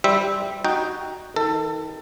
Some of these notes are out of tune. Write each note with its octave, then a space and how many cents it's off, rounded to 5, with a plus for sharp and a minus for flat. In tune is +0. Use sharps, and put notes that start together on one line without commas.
G3 +0 C5 +0 E5 -10
D#4 +0 F#4 +0 G5 +0
D#3 +40 A4 +25